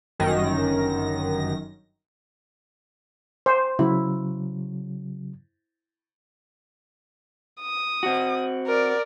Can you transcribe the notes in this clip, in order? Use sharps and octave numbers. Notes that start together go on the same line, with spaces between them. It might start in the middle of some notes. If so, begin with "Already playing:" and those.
G1 F#2 D#3 A#6
C5
C#3 F#3 E4
D#6
C4 F#4
A#4 D5